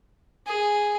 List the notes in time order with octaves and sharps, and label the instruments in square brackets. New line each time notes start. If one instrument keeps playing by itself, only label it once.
[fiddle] G#4